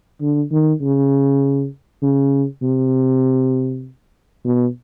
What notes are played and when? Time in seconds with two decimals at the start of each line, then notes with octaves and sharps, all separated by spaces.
0.21 D3
0.51 D#3
0.82 C#3
2.03 C#3
2.62 C3
4.45 B2